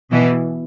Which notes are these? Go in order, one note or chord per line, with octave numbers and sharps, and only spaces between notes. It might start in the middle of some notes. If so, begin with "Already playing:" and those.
B2 E3